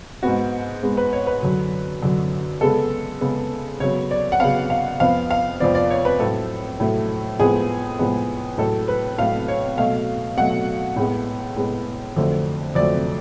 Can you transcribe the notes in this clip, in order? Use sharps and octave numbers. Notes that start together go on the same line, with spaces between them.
G#2 G#3 B3 F#4
G#2 G#3 B3
B4
C#5
B4
F#2 D3 F#3
F#2 D3 F#3
C#3 G#3 B3 A4
C#3 G#3 B3
C#3 F#3 B3 C#5
D5
F#5
C#3 F#3 B3 F5
F5
F2 F3 B3 F5
F5
F2 F3 B3 D5
D5
C#5
B4
A2 F#3 A3 A4
A2 F#3 A3
A2 F3 G#3 B3 G#4
A2 F3 G#3 B3
A2 F#3 A3 A4
B4
A2 F#3 A3 F5
C#5
B2 F#3 A3 F5
B2 F#3 A3 F#5
A2 G#3 B3
A2 G#3 B3
F2 D3 F#3 A3
F2 D3 F#3 A3 D5